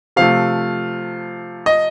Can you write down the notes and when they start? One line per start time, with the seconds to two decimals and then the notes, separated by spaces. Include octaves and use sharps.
0.16 C3 F3 A3 F5
1.66 D#5